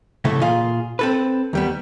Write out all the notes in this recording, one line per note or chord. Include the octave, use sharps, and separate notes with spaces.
C2 C#3 E3 A3
A#2 F4 G#4 F5
C4 A4 B4
D#2 G3 B3